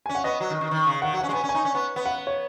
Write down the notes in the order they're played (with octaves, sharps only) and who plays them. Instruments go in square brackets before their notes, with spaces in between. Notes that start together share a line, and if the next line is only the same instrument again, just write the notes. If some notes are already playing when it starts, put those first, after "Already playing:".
[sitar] C#4 [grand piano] G#5
[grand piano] F#5
[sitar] B3 [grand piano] D#5
[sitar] F#3
D#3
D#3
D#3
C#3
[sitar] D#3 [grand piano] F#5
[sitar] F#3 [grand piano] F#5
[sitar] C#4
G#3
[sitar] B3 [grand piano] G#5
[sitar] C#4
[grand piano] G#5
[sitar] D#4
C#4
B3
B3
[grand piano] F#5
C#5